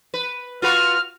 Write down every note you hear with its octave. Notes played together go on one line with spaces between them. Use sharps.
B4
F4 F#4 B4 F6